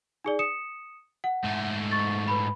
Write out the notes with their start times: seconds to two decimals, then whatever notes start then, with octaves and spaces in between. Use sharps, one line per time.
0.24 D#4 G#4 D5
0.39 D#6 C#7 E7
1.24 F#5
1.44 G#2 A3
1.91 C#6 A6
2.28 B4 B5